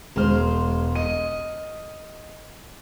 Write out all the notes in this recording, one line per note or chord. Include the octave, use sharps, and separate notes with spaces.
E1 G#3 C5 F6
D#5 D#7